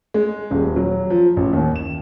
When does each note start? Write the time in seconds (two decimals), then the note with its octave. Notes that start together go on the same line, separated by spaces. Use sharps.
0.14 G#3
0.51 D#1
0.76 F#3
1.10 F3
1.37 A1
1.53 D#2
1.76 E7